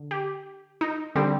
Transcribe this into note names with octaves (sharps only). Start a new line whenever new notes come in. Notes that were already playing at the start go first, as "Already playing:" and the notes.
Already playing: D3
G4
D#4
D3 G3 C4